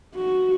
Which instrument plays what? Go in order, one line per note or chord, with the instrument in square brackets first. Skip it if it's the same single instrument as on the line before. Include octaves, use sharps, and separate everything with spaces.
[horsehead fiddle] F#4